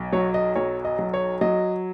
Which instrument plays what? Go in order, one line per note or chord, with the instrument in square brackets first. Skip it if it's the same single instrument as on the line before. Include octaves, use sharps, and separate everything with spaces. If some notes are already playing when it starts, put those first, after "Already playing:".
Already playing: [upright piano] B1
F#3 C#5
D#5
B1 C#5
D#5
F#3
C#5
F#3 D#5